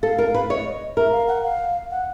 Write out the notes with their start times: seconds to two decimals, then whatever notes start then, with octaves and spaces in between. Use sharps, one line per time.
0.03 A4 F5
0.18 A#4
0.26 F5
0.34 B4
0.50 C#5 D#5 E5
0.97 A#4 E5
1.12 F5
1.28 F#5
1.44 F5
1.91 F#5